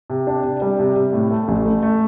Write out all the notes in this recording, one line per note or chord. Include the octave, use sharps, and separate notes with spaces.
C3
D4
C3
G3
C3
C3
A2
A3
A1
A3
A3